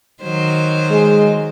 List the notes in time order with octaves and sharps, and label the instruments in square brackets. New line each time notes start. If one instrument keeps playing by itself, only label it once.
[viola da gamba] D#3 F#3 C5
[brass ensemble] G#3